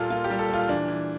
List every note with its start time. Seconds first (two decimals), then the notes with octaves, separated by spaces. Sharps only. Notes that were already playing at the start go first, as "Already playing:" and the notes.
Already playing: A#2 G3 A#3 F4 A4
0.10 A#3 F4
0.24 G4
0.30 G3
0.39 A4
0.50 A#2 F4
0.68 E3 D4
0.88 E3